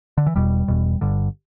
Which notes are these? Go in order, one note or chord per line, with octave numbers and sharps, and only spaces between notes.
D3
E3
E1 E2 B2 G3
E1 E2 B2
G1 G2 D3